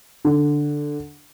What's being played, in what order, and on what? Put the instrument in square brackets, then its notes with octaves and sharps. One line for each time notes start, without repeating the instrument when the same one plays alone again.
[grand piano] D3